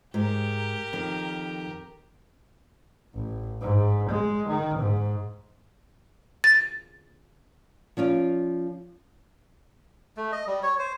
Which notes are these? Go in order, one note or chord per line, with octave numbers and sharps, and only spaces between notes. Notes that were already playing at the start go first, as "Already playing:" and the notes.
G#2 G4 A#4
F2 D#3
A1
G#2
G#3
D#3
G#2
A6
F3 C#4 F4 D5
A3
D#5
G3
C#5
C5